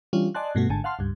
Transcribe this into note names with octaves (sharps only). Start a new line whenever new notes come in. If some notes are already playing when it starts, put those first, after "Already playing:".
E3 G3 C#4 D4 F4
D5 D#5 G#5 A5 C6 F#6
G2 B2 A3 F#4
G#1 G#2 D3 G#5 A5
F5 F#5 A5 C6 F6
C#2 G2